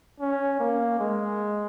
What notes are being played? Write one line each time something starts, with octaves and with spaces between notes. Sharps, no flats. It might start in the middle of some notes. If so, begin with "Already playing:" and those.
C#4
A#3
G#3